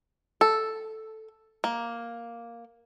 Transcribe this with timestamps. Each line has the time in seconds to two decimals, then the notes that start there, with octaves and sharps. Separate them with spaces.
0.41 A4
1.64 A#3